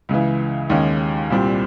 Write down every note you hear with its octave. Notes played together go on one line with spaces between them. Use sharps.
C#2 C#3 E3
D#2 D#3 G#3 C#4
C2 A#2 G3 C4